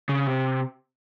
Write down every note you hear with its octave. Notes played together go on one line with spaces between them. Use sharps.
C#3
C3